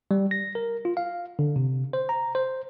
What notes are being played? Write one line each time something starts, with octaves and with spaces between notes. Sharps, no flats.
G3
A#6
A#4
F4
F5
D3
C3
C5
A#5
C5